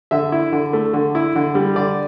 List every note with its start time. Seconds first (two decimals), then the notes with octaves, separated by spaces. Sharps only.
0.11 D3 E5
0.32 E4
0.52 D3
0.73 A3
0.93 D3
1.15 E4
1.35 D3
1.55 G3
1.76 D3 D5